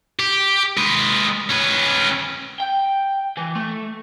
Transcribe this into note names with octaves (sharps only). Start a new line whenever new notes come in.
G4
G#3 B4
C#4 B4
G5
E3
A3